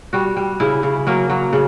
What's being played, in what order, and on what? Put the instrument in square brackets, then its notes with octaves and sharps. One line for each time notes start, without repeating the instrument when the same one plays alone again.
[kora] G3 F#4
G3
C#3 E4
C#3
F#3 A#3
F#3
C#3